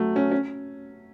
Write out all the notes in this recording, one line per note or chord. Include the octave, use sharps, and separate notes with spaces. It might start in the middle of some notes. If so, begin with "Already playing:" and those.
Already playing: F#3 A3
C#4
C#4